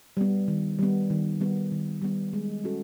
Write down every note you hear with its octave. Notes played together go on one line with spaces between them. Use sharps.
G3 B3
D#3
G3 B3
D#3
G3 B3
D#3
G3 B3
G#3
C#4 F#4 A4